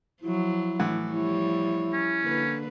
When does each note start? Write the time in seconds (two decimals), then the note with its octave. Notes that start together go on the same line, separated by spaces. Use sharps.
0.22 F3 F#3 E4
0.79 A2 E3 F#5
1.12 F3 G3 E4 C#5
1.93 C#4
2.23 D3 A#3 B4